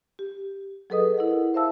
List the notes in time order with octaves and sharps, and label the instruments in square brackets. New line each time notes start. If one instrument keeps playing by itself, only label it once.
[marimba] G4
F#3 G#4 A4 B4 D#5 D#6
E4 A#4 F#5
C5 E5 F5 A5 E6